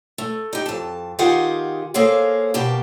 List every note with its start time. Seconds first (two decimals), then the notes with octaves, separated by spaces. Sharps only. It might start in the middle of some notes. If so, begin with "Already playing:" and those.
0.18 A3
0.53 D#4 G4
0.66 F2 A5
1.19 D#3 F4 G4 G#4 F5 F#5
1.94 A#3 G#4 A4 C5 C#5 F5
2.54 B2 A#3 G4 A5